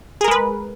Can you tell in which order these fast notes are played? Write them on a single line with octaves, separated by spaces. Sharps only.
G#4 A#4 G#3 B4